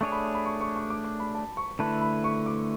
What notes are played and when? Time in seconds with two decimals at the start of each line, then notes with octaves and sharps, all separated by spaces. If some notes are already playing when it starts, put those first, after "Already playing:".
0.01 A3 D4 G#4 C#5 C#6
0.12 B5
0.24 C#6
0.35 B5
0.46 C#6
0.61 C#6
0.76 C#6
0.90 D6
1.05 D6
1.20 B5
1.35 A5
1.57 C#6
1.79 D3 A3 E4 B4 A5
2.01 B5
2.24 C#6
2.46 D6